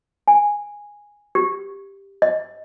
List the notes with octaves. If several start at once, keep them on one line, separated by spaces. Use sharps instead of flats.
G#5
G4
D#5